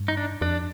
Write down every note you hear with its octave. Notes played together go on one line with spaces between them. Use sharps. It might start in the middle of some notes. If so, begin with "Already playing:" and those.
Already playing: G2
D#4
D4
F2 D4